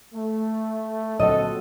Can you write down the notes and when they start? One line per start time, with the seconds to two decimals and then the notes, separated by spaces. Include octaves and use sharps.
0.14 A3
1.20 A#2 D3 F#3 C4 A4 D#5 F#5